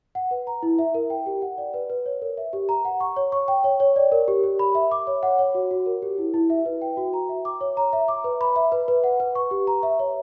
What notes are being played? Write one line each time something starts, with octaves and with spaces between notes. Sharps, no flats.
F#5
B4
A#5
E4
E5
A#4
G5
G4
F#5
D5
B4
B4
C#5
A#4
E5
G4
A#5
F#5
C#6
C#5
C#6
G5
C#5
C#5
D5
A#4
G4
G4
B5
E5
D6
C#5
F#5
C#5
F#4
F#4
A#4
G4
E4
E4
E5
B4
G5
F#4
A#5
E5
D6
C#5
A#5
E5
D6
B4
B5
E5
B4
B4
F#5
B4
C#6
G4
A#5
E5
C#5